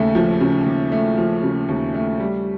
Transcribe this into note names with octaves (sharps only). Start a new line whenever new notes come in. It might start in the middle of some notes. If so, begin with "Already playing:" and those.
Already playing: D#2 C#3 A3
F3
C#3
D#2
A3
F3
C#3
D#2
A3
G3